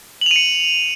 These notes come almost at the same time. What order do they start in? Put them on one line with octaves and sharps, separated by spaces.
F#7 F7 D#7 C#7